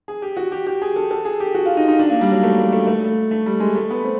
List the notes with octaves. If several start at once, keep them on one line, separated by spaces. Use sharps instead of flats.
G#4
G4
F#4
G4
G4
G#4
A4
A4
G#4
G4
F#4
F4
D#4
D#4
D4
A#3
G3
F#3
A3
A3
A3
A3
A3
G3
G#3
A3
B3
C4